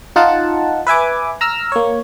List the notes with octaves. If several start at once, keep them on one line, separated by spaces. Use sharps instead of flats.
D#4 F4 F#5 A5
B4 E5 G#5 D6
A#5 E6 F6
A#3 C#5